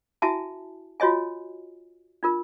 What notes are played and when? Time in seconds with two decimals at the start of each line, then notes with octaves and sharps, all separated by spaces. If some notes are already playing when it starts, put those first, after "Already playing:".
0.22 E4 F#4 E5 G#5 A5
1.00 F4 F#4 C#5 D#5 G#5
2.23 D4 F4 A#4